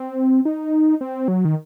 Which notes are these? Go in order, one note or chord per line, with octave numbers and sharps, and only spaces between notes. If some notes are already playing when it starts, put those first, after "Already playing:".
Already playing: C4
D#4
C4
F#3
D#3